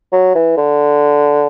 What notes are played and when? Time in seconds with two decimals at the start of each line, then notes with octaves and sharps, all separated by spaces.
0.12 F#3
0.35 E3
0.57 D3